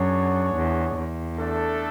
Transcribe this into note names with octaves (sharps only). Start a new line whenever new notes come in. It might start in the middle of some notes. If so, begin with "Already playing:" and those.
Already playing: F#2 D4 G#4 C#5 F#5
E2
E2
A3 D4 A4